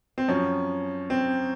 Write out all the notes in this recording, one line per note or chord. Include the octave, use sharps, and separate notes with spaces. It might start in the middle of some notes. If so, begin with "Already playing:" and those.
C4
F#2 F3 C#4
C4